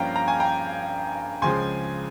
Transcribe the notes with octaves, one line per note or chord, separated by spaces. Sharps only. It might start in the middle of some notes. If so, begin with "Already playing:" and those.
Already playing: G2 F3 A#3 C#4 F5 G5 A#5
A#5
G#5
G5 A#5
C#2 C#3 F3 G#3 G#5 C6